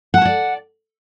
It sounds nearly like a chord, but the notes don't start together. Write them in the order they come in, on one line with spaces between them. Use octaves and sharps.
F#5 A5 C#5 D5